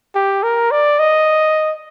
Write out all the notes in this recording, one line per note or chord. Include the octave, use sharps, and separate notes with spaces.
G4
A#4
D5
D#5